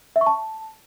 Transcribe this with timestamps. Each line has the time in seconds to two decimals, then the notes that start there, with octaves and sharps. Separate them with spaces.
0.16 E5
0.21 C#6
0.26 A5